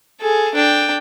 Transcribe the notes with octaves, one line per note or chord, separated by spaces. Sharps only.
G#4 A4
D4 G5